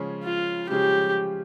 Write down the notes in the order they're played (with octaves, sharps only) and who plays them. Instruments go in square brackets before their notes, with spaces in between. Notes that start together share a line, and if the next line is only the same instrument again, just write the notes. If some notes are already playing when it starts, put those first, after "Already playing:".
Already playing: [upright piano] C#3 F3 G#3 C#4 G#4
[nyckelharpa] F4
[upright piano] C#3 F3 G#3 C#4 G#4 [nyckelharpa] G4